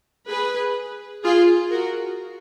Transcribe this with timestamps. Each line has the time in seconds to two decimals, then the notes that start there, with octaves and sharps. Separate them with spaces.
0.28 G#4 B4
1.24 F4 G#4
1.70 F#4 A#4